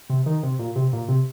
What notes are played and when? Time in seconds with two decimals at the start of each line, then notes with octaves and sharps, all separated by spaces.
0.10 C3
0.26 D#3
0.43 C3
0.59 A#2
0.76 C3
0.93 A#2
1.08 C3